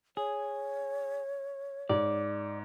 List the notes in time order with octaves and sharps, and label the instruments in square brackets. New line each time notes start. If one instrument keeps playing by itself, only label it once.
[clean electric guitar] G#4 [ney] C#5
[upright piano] G#2 [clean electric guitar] D5